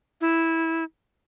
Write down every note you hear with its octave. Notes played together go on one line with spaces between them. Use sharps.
E4